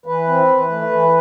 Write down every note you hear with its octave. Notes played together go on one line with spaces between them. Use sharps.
E3 B4
C4
E3
A3
E3